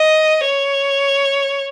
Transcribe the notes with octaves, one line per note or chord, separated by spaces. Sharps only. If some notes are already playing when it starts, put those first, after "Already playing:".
Already playing: D#5
C#5